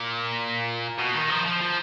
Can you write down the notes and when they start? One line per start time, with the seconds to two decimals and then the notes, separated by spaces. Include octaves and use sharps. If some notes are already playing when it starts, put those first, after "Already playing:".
Already playing: A#2
0.98 B2
1.14 D#3
1.30 F3
1.46 F3
1.61 F3